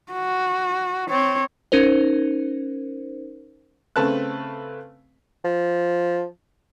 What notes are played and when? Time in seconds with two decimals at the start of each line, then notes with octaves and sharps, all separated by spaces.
0.13 F#4
1.09 C4 C#5
1.72 C#4 D#4 A#4 C5
3.96 C#3 A3 C4 B4 A5 F#6
5.45 F3